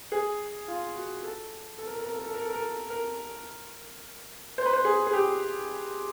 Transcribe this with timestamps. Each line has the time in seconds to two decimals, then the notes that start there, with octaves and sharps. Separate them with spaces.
0.12 G#4
0.68 F4
0.96 F#4
1.23 A4
1.78 A4
1.87 A#4
1.95 A4
2.03 A#4
2.11 A4
2.19 A#4
2.27 A4
2.34 A#4
2.42 A4
2.50 A#4
2.57 A4
2.90 A#4
4.58 C5
4.66 B4
4.73 C5
4.85 G#4
5.07 G#4
5.13 G4